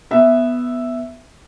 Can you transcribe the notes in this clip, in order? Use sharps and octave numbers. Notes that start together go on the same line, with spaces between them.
B3 E5